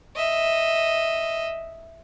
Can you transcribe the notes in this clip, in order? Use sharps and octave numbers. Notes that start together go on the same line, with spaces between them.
D#5 E5